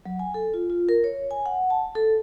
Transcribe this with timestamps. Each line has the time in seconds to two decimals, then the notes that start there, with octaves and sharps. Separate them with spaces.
0.06 F#3
0.19 G#5
0.34 A4
0.54 F4
0.70 F4
0.89 A#4
1.04 C#5
1.31 G#5
1.46 F#5
1.70 A5
1.95 A4